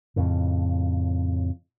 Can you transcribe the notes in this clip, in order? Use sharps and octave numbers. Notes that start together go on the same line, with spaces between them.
F2 A2 C#3